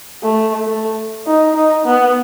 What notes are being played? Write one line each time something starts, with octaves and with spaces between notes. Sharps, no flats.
A3
A3
D#4
D#4
B3